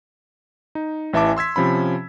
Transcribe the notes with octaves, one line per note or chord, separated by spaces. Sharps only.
D#4
A1 E3 E5 A5 D6
C6 E6 G#6 B6
C3 F3 C#4 B5